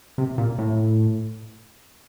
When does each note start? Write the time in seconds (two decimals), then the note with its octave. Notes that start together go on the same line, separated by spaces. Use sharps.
0.18 C3
0.38 A#2
0.58 A2